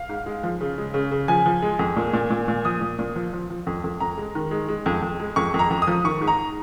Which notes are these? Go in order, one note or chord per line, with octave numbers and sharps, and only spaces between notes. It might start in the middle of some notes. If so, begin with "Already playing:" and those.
Already playing: F5
G#2
G#3
F3
C#3
G#3
C#3
C#3
F3 G#5
F3
G#3
F2
A#2
A#2
A#2
A#2
F3 D#6
A#2
A#2
F3
F3
F3
F2
F2
F2 A#5
G#3
D#3
G#3
G#3
F2
F2
G#3
F2 C#6
F2
A#5
F2
D#6
F3
D#3 C#6
G#2
A#5